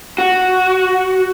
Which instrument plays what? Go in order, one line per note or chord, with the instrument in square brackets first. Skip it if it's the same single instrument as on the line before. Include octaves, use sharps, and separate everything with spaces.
[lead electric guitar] F#4